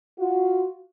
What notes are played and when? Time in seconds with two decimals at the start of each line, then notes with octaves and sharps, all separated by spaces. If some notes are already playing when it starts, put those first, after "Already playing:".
0.19 F4 F#4